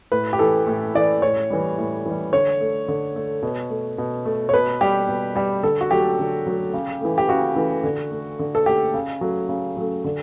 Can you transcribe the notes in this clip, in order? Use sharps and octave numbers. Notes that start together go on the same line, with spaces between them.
A2 B4
G4
E3 A3 A4
A2
E3 A3 D5
A2 C#5
E3 G3
A2
E3 G3
D3 C#5
A3
D3
A3
B2
A3
B2
A3
C#5
B2 B4
G3 G4
B2
G3 G4
D3 A4
F#4
F#3 A3 G4
D3
F#3 A3
C#3
E3 A3
G4
C#3 F#4
E3 A3
D3
A3
D3
A4
A3 G4
C#3
F#3 A3
C#3
F#3 A3
D3